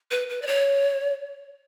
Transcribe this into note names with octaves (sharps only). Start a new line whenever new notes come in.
B4
B4
D5
C#5